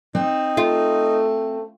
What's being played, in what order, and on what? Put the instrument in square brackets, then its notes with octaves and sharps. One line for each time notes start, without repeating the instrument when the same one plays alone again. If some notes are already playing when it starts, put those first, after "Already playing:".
[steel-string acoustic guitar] C4 [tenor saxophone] D#4
[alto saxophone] A3 [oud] F4